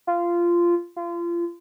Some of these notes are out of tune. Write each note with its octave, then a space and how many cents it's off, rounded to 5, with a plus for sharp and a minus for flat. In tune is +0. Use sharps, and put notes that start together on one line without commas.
F4 -15
F4 -30